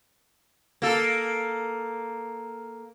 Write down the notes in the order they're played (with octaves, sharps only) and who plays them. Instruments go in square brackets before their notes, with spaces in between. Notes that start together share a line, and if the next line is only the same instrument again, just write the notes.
[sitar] A#3 A4